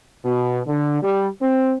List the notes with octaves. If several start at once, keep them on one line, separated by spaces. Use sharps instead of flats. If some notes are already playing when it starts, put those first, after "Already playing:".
B2
D3
G3
C4